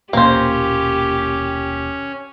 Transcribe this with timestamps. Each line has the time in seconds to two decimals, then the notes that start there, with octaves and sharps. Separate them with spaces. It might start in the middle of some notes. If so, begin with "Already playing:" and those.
0.13 D#1 B1 A#2 A#3 C#4 G4 C5